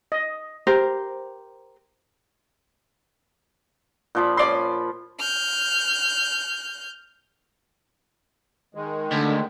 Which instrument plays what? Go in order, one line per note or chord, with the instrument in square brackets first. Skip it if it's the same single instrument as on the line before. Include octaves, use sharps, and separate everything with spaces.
[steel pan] D#5
[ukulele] G4 A#4 C5
[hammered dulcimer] A#2 F3 B5
[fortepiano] C#4 D5 C6
[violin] F6 G6
[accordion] D#3 G#3
[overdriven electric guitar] D2 [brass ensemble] D3